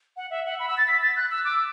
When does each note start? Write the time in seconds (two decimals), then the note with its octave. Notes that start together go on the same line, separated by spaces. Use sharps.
0.17 F#5
0.31 E5
0.45 F#5
0.60 B5
0.68 E6
0.78 A6
0.88 B6
1.02 A6
1.16 F#6
1.31 E6
1.45 D6